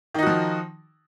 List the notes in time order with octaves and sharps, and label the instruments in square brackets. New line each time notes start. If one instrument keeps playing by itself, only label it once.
[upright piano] D#3
D#4
F#4
F3